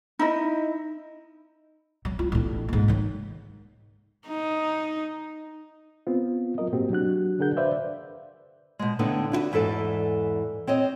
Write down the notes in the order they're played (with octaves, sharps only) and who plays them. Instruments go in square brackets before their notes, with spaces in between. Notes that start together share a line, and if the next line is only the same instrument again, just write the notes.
[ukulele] D#4 E4 D#5
[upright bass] F#3
F4
A1 D4
G#2 A#3
D#3 F#3
[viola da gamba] D#4
[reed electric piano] B3 C4 F4
F#3 F4 A#4 D#5
G#2 B2 A#3 C4 F#4 G4
F#3 D4 F#4 F#6
D3 D4 G#4 A#4 F#5 G6
B4 C5 D5 E5 F5
[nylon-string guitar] B2 G#3
A2 D3 B3 D#4
D4 E4 F#4 B4
E2 G#2 E3 A4 D5
C4 C#5 D#5